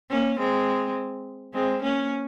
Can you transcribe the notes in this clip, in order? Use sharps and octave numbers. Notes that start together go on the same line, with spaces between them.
A#3 C#4
G#3 C4
G#3 C4
A#3 C#4